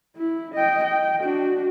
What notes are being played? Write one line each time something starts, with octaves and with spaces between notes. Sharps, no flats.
E4
D#5 G5
G5
D4 F#4